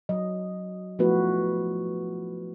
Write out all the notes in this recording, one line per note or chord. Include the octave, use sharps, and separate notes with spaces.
F#3 D#5
F3 A3 B3 E4 F#4 B4